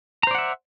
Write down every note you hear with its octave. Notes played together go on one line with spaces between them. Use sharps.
C5 D5 E5 F#5 A#5